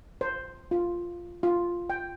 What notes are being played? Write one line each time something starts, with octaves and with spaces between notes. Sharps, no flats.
C5
F4
F4
G5